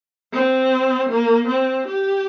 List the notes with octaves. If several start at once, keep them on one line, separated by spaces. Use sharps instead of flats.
C4
A#3
C4
G4